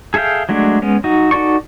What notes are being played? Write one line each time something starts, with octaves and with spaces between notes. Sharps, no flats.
G#4 A4 E5 F5 G5
F#3 G#3 A3 D4
G#3 B3 C#4
F#3 D#4 F#4
D#4 F#4 A4 D5 C#6